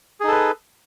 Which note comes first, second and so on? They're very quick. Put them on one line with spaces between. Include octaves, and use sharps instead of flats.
G#4 D#4 A4 B4